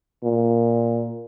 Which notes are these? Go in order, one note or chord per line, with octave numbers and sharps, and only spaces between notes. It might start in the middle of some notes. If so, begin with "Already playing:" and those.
A#2